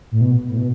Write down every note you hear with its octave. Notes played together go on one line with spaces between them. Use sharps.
A2
B2
A2
B2